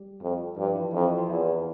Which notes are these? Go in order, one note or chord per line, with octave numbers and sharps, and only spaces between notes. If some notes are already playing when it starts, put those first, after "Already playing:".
Already playing: G3 G4
F2
G2 F3 F4
E3 E4
F2 E3 E4
E3 E4
F3 F4
E2 E3 E4